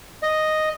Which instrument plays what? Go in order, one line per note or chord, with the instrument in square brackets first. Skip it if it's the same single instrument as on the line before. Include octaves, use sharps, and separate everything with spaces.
[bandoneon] D#5